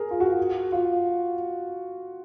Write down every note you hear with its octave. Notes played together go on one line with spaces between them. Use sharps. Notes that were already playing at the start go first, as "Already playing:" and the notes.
Already playing: G#4 A#4
F4
F#4
F4